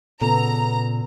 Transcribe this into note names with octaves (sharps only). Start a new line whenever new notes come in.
A#2 C#3 B3 A4 A#5